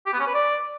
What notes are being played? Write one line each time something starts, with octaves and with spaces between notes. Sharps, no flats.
G4
B3
C#4
B4
D5